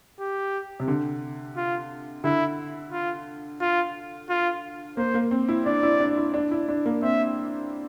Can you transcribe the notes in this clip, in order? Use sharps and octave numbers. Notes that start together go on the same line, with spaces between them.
G4
C3
D3
F4
D3 E4
F4
F4
F4
A#3 C5
A#3
C4
E4
D4 D5
E4
D4
E4
D4
E4
D4
A#3
C4 E5